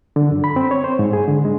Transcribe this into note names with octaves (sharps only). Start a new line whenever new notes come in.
D3
F#2
B5
C4
C#5
C5
G#2
G#4
D3
G#3